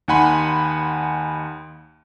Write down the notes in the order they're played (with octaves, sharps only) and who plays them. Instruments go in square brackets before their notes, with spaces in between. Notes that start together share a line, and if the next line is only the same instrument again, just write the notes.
[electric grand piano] D#2 D#4 F#5 G#5 B5 C6